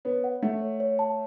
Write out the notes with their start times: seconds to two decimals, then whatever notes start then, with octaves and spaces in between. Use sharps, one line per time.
0.05 B3 C#5
0.24 F#5
0.42 A3 F#5
0.61 C#5
0.80 C#5
0.99 A5